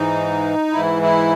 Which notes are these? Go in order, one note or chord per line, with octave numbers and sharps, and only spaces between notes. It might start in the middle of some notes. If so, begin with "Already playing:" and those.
Already playing: G#2 E3 D#4
G#2 E3 E4
E4